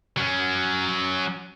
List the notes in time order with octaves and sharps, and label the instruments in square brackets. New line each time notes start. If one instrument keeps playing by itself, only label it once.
[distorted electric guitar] F#3 C#4